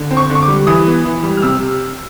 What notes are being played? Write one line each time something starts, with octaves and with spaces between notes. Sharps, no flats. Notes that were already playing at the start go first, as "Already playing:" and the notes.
Already playing: D3
C4
C#6
D3
C#6
D6
G3
E3 D#6
B3
E3
G3
F6
C3 E6